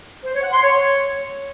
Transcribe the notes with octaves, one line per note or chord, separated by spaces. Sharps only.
C5
C#5
F#5
C6
C#5